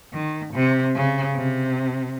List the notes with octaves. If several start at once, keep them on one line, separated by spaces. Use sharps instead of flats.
D#3
C3
C#3
C3